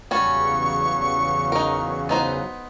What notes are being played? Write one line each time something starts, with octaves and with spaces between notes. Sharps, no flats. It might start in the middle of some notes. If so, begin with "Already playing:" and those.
E2 C#3 F#3 G3 C#4 F#4 C#6
D#4 A#4
B3 D#4 C5